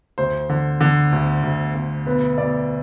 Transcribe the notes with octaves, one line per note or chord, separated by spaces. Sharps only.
D2 C5
D3
D3
D2
D2
D3
B1 B4
B1 D5